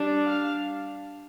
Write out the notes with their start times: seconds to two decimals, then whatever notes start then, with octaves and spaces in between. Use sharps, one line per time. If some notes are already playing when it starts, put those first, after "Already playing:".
Already playing: G3 D4
0.26 F5